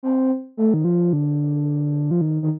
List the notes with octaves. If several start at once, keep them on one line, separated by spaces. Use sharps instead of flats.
C4
A3
D#3
F3
D3
F3
D#3
D#3